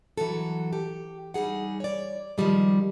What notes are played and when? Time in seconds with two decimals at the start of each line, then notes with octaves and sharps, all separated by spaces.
0.17 E3 F#3 F#4 A4
0.73 G4
1.34 G3 D#4 G#4 F#5
1.80 C#5 D5
2.38 D#3 F3 G3 G#3